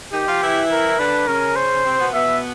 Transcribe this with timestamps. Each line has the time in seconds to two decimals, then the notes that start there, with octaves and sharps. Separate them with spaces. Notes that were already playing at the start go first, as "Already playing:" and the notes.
0.13 D#3 D#4 G4
0.27 F3 F4
0.41 E3 E4
0.71 A#4
0.99 D3 D4 B4
1.27 C#3 C#4 A#4
1.56 C5
1.85 C3 C4
1.99 B2 B3
2.13 B2 B3 E5